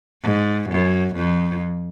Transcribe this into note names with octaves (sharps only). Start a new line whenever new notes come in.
G#2
F#2
F2